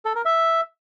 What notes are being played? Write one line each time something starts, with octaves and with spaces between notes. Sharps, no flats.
A4
A#4
E5